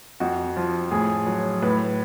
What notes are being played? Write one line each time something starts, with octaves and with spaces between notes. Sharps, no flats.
F2 F#4
F3
A2 G#4
F#3
A2 B4